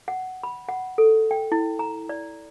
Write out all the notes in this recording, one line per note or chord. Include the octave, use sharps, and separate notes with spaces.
F#5
B5
F#5
A4
G5
E4
A#5
D5